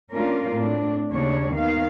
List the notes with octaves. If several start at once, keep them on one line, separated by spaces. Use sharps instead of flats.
A3 A#3 C#4 D4 F4 A#4
A2 C4 D4
D#2 C#3 D4 C#5
D#3 B3 F5